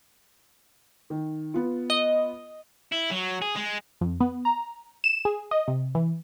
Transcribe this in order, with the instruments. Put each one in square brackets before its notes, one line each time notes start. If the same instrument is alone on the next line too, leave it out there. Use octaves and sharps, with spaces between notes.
[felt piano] D#3
B3 F4
[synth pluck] D#5
[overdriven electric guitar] E4
F#3
G#4
G#3
[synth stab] F2
B3
A#5
E7
G#4
D#5
C3
E3